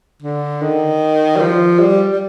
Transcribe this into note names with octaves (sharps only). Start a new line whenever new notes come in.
D3
D#3
G3
F3
G3
G3